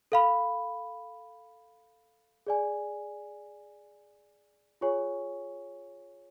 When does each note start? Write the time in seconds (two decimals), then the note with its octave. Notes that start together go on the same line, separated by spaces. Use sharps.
0.12 A4 F5 B5
2.47 G#4 D5 G#5
4.81 F4 G#4 C#5 G#5 C#6